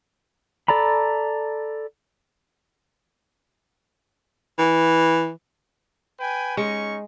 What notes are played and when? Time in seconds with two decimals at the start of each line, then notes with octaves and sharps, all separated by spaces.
0.68 A4 D5 A#5 B5
4.58 E3
6.20 B4 G5 G#5
6.57 G#3 C#4 D#4 C#6